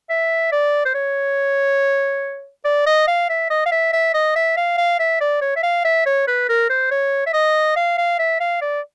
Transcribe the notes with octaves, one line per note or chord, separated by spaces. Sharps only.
E5
D5
C5
C#5
D5
D#5
F5
E5
D#5
F5
E5
E5
D#5
E5
F5
F5
E5
D5
C#5
E5
F5
E5
C#5
B4
A#4
C5
C#5
E5
D#5
F5
F5
E5
F5
D5